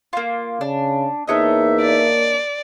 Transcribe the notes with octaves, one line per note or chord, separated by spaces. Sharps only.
A#3 F4
C#3 D4
E2 A#3 D4 D#4 C#5 D#5 E5
D5